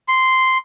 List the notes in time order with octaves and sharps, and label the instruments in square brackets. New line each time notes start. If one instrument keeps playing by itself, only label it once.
[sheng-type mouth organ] C6